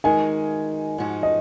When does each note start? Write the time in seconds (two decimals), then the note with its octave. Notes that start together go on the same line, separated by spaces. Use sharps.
0.04 D#3 G#3 D#4 F#4 G#5
0.98 G#2 F3 G#3 D#4 F#4
1.23 D#5